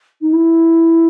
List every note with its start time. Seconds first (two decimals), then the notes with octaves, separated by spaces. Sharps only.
0.21 D#4
0.33 E4